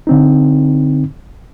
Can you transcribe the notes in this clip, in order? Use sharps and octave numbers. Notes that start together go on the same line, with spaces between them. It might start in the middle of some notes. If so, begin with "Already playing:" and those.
D3 C4 D#4